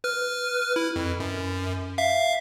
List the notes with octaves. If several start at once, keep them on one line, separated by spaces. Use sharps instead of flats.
B4 F6
E4
F2
F#2
E5 F5